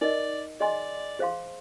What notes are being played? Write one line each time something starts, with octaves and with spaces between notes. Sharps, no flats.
D#4 A#4 D5 D#5
G#4 D5 D#5 G#5 C6
G#4 C5 F5 C6